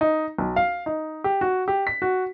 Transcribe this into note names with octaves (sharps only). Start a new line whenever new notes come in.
D#4
B1
F5
D#4
G4
F#4
G4
B6
F#4